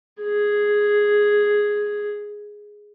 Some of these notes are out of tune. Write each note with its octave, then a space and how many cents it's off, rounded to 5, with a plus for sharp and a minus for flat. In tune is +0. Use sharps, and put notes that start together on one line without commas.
G#4 +0